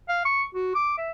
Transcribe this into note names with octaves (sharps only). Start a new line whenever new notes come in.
F5
C#6
F#4
D6
E5